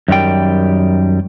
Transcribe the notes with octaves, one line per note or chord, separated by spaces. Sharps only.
F#2 D#3 G3 G5